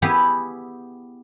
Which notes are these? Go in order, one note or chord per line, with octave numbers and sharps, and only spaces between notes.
B3 E4 G4 G#4